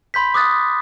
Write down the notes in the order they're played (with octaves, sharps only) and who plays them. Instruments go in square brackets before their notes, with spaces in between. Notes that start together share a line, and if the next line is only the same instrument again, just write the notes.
[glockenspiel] B5 C6 G6 B6
D6 D#6 F#6 A6